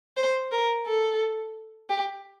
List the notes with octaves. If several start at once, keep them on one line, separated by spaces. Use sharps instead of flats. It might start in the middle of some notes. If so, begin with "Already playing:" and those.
C5
A#4
A4
G4